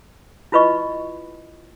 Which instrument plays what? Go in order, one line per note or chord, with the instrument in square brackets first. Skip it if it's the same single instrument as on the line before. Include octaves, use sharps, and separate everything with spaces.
[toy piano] E4 F4 B4 D#5 C#6